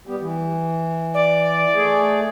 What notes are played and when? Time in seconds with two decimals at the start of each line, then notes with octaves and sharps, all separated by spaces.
0.07 G3 B3 G4
0.20 E3
1.14 D5
1.75 A3 G#4